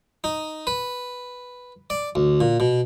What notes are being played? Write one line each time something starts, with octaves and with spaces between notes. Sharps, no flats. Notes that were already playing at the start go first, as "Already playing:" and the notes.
D#4
B4
D5
D2
A#2
B2